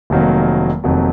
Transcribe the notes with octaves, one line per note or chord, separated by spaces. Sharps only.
F1 F2 D#3 F#3 A#3
F1 F2 D#3 F#3 A#3